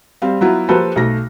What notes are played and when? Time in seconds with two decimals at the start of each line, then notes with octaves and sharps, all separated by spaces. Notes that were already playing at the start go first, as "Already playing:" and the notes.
0.22 G3 C4 F5
0.41 F#3 B3 E4 F4
0.69 F3 A#3 G4 A4 B4 C5
0.96 B1 A3 A#6